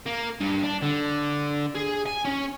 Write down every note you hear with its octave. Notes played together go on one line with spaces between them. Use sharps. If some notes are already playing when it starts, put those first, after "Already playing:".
A#3
G2
D4
D3
G#4
G#5
C#4